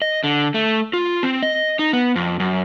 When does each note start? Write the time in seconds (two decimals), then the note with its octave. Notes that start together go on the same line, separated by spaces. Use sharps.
0.02 D#5
0.24 D3
0.54 A3
0.93 F4
1.23 C4
1.43 D#5
1.79 D#4
1.93 B3
2.16 F2
2.40 F#2